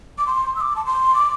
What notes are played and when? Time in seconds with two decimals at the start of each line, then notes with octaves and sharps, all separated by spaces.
0.18 D6
0.26 C6
0.56 E6
0.61 D6
0.76 A5
0.86 C6
1.14 D6